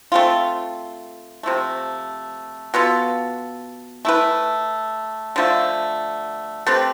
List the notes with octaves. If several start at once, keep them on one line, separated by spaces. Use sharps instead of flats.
A3 C4 F4
C3 F3 A3
B2 B3 F4 A4
A3 E4 B4
D3 F3 A3
A3 C4 G4 B4